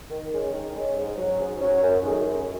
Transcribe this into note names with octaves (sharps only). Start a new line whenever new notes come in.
D#3
G#3 C#4
D#3
G#3 C#4
G#2
F#3 C#4
G#2
F#3 C#4
F#2
D#3 A3 C#4 G#4
F#2